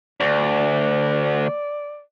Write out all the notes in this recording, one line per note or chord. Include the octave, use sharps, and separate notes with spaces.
D2 D5